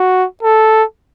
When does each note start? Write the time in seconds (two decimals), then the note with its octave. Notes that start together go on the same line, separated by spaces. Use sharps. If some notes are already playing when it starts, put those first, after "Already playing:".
Already playing: F#4
0.43 A4